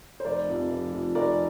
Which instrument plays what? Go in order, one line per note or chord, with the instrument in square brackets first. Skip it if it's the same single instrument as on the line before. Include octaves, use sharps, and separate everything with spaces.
[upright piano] C5
F1 A#4 D5
F2 C3 F3
F1
F2 C3 F3
F1 A#4 D5